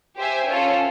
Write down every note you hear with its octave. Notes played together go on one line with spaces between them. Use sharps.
G4 C5 E5 G#5
C#4 F4 A4